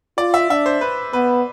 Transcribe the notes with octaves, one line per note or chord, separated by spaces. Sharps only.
F4 D5
E5
D4 E5
C5
B4
B3 B4